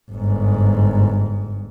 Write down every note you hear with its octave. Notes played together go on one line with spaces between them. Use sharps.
G1 G#2